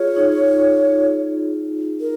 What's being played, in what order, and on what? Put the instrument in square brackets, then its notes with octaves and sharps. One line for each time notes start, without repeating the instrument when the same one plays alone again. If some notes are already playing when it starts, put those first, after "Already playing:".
Already playing: [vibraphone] F4 G#4 [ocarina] C#5
[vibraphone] D#4
[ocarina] A#4